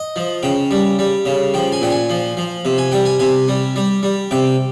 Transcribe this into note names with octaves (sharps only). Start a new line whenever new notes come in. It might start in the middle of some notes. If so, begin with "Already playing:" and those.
Already playing: D#5
F3
C#3 G5
G3
G3
C#3
F3 G5
G#5
A#2 G5
G#5
F3
F3
C3
G#5
G3 G5
G#5
C3 G#5
G3
G3
G3
C3 G5